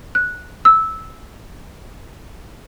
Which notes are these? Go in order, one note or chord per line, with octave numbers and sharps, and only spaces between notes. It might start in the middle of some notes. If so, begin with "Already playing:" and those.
F#6
E6